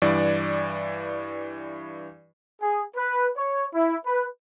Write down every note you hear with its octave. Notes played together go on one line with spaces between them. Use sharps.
G2 E3 D5
G#4
B4
C#5
E4
B4